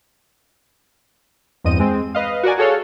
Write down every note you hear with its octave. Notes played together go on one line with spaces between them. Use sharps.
E2 G2 C4 D#5 D#7
G#3 C4
B4 D#5 F5
F#4 A#4 D5 G#5
F#4 G#4 A4 C#5 F5